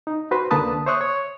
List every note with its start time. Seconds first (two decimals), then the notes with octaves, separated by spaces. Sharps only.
0.07 D#4
0.31 F#4 B4 C5 C6
0.51 C#2 D3 A#3 B4 A5 D#6
0.86 C5 C#5 E5 C#6 D#6 F#6
1.01 C#5